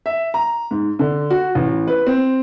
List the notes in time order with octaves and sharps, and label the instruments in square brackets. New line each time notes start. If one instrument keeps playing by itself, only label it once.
[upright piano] E5
A#5
G#2
D3
F#4
A1
B4
C4